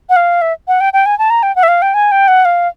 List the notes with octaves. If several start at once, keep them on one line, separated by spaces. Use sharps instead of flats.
F#5
F5
E5
F#5
G5
G5
G#5
A5
A#5
G5
F#5
E5
F5
G5
G#5
G5
F#5
F5